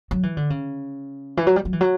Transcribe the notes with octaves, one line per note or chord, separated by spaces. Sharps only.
F#3
E3
D3
C#3
E3
F#3
G3
F#3
E3
F#3